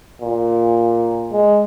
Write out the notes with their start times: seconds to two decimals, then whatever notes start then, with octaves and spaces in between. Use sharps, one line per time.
0.21 A#2
1.31 G#3